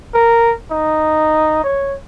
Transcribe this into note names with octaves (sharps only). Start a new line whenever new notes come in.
A#4
D#4
C#5